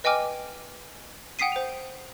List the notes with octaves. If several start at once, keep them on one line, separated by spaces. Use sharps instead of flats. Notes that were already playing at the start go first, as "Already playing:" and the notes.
B4 D#5 G5 G#5 D6 F6
F#5 G5 D#6 B6 C7 D#7
C5 F7